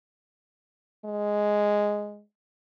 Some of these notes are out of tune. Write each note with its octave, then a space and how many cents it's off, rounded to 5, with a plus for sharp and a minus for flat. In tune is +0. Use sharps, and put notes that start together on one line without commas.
G#3 +0